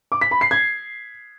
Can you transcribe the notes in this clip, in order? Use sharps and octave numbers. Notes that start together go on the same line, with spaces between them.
D6
B6
B5
C7
G#6